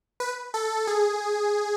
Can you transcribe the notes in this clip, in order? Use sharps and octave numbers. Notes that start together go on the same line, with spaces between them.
B4
A4
G#4